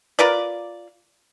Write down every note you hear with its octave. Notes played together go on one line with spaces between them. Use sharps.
F4 A#4 B4 D5